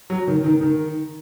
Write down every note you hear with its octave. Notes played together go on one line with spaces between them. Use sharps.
F#3
D#3
D#3
D#3